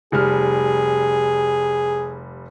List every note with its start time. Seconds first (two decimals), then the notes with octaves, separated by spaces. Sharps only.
0.12 F1 G3 G#4 F6